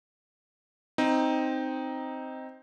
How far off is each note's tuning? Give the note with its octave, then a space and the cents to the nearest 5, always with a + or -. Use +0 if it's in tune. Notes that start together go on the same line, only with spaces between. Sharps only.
C4 +0 D#4 +0